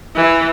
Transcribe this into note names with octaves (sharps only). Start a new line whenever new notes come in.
E3